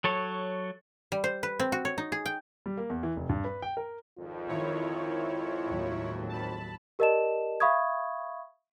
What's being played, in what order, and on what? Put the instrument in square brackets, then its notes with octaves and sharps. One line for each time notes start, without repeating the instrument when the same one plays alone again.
[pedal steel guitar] F#3 A4 C#5
[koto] G3
C5
B4
C4
F#4
C#5
D#4
G#4
G5
[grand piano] G3
A#3
E2
E3
F1
G2
B4
G5
A#4
[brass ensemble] G#1 F2 [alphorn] F4
[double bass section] D#3 [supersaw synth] E4 C#5
[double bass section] D#2 A2 F#3
[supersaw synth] A5 B5
[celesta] G4 A#4 D5 D#5 A5 E7
E5 F5 B5 C#6 D#6 G#6